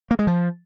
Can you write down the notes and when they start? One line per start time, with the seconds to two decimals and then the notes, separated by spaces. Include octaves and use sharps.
0.11 A#3
0.19 G#3
0.27 F3